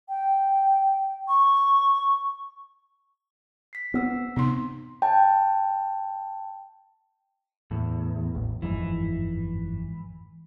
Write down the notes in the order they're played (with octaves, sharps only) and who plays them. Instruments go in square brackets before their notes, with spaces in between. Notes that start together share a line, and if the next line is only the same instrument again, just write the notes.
[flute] G5
C#6
[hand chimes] B6 C7
[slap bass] B3 [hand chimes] C4 E6 B6
[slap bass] C3 [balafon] B3 D#4 C6
[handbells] G5 A5
[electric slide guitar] E2 [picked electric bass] A2
[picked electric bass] A1
[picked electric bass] G1 F2 G#2 [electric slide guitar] E3